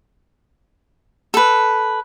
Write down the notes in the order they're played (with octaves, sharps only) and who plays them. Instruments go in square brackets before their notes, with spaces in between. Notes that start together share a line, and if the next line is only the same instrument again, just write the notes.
[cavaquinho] A4 B4